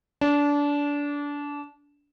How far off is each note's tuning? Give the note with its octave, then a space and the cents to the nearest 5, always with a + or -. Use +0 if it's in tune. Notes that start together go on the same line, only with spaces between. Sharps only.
D4 -25